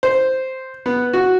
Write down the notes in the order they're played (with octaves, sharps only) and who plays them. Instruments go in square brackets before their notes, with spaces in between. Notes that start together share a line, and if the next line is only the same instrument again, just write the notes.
[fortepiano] C5
B3
F#4